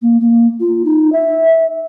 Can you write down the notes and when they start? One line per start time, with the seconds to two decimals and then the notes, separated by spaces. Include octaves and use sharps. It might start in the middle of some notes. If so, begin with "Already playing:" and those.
0.02 A#3
0.20 A#3
0.60 F4
0.85 D#4
1.12 E5